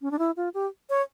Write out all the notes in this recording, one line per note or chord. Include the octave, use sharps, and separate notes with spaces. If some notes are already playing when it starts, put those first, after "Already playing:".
C#4
D4
E4
F4
G4
C#5